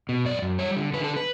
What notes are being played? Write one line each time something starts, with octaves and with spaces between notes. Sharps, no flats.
B2
F#2 D5
F#2
G3 C#5
D3
D3 B4
A4
B4